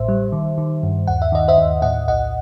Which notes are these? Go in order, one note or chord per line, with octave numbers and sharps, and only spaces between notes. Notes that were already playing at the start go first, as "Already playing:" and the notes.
Already playing: A1 A2 C5 E5
G3
D#3
D#3
G2
D#2 F#5
E5
D#3 D#5
C5 E5
D#2
A2 D#5 F#5
B1 D#5 F#5